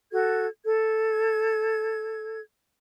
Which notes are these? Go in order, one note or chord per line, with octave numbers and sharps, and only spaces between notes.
F#4 A4 G#6
A4 G#6